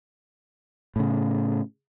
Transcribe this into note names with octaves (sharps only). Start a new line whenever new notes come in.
A2 C#3